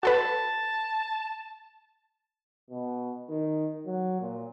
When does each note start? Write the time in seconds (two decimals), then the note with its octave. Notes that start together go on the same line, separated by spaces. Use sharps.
0.03 F#4 A4 B4 A5
2.71 B2
3.29 D#3
3.86 F#3
4.21 A#2